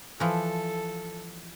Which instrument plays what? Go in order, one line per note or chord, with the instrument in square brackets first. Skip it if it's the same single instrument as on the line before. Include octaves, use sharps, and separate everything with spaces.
[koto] E3 F3 [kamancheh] A4